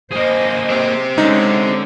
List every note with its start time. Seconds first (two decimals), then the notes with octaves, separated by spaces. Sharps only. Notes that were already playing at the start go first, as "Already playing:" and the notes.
0.12 A#3 G#4 C5 D#5
0.70 C4 G4
1.18 D3 G#3 C#4 D#4